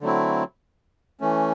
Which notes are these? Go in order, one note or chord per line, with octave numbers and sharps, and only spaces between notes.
D3 F#3 A3 C4 E4
E3 A3 C#4